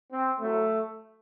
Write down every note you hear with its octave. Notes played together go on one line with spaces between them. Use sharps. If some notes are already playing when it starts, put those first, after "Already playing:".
C4
A2 F#3 A3